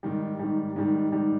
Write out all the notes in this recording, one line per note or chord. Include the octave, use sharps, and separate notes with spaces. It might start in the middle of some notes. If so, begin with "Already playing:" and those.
G#2 D#3 G3
G#2 D#3 G3
G#2 D#3 G3
G#2 D#3 G3